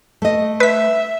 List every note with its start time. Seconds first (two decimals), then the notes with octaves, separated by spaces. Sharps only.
0.22 A3 D#5
0.60 B4 E5 B6